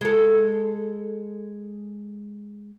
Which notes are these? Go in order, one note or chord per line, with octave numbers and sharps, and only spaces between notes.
G#3 A4